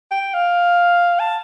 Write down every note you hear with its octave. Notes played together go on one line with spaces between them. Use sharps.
G5
F5
A5